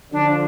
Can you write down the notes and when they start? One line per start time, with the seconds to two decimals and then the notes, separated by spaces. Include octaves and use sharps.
0.12 D3 F3 D4